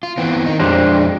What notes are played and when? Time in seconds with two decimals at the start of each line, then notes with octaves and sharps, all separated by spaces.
0.03 F4
0.17 E3 B3 C4
0.46 D#3 D#4
0.60 F2 G#3 D4 G4 C5